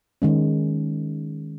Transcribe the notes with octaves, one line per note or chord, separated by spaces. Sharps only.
D#3 G#3 C#4